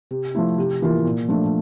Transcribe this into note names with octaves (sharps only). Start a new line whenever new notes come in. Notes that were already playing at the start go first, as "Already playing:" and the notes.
C3
F3 A3 E4
C3
E3 A#3 F4
A#2
F3 A3 D4